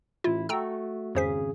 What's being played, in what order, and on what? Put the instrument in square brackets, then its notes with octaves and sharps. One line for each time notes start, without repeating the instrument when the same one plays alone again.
[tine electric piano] A1 E4 [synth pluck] F4
[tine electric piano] A3 F#4 [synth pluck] G5 A#5 E6
[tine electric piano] G#1 C#3 G#4 [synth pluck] F2 C5 B6